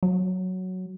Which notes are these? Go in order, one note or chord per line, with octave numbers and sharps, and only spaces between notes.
F#3